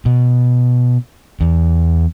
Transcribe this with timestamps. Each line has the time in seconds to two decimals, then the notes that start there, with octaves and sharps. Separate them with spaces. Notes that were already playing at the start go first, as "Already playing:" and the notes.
0.06 B2
1.40 E2